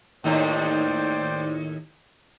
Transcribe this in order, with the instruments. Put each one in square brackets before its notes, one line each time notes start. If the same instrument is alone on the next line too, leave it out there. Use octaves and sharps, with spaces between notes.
[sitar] D#2 A2 D#4 [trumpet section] C5 D5 G5